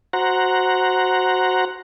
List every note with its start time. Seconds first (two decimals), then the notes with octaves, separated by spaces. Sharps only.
0.13 F#4 C5 F#5 A#5